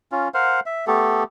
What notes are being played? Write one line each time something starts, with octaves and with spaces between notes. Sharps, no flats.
C#4 F4
A#4 C5 F5 F#5
E5
A3 B3 G4 A4